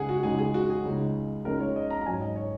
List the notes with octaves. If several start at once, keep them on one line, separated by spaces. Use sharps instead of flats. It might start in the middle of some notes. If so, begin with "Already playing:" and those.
Already playing: C#2 C#3 G#3 D#4 G#4 F#5
F#4
C#2 C#3 G#3 D#4 G#4
G#4
F#4
G#4
C#2 C#3 G#3 D#4
C#2 C#3 G#3 D#4 A#4
C#5
D#5
A#5
A#5
G#2 F#3 C#4 G#5
D#5
C#5